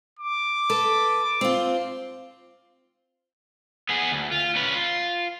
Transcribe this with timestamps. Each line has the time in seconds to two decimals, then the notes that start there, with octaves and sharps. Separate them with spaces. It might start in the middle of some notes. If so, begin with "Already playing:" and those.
0.19 D6
0.70 A4 B4
1.41 C4 F4
3.89 B3 G#4
4.12 D2
4.31 F4
4.56 C#4 B4
4.74 F4